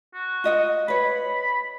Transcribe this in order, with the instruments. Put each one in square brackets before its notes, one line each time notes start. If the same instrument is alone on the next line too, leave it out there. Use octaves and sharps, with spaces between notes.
[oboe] F#4
[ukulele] F4 D#5 F#5
[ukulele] B4 C#5 [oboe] B5